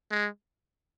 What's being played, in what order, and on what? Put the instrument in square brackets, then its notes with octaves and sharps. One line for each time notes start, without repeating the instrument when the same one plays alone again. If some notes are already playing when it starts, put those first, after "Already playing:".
[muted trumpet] G#3